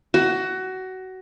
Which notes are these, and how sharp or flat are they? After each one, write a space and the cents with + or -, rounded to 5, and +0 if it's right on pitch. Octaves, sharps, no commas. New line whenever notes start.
F#4 +20